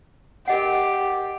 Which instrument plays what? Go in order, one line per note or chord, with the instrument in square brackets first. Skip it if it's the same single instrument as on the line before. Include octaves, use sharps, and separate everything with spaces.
[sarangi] G4 [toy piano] A#4 D#5 F#5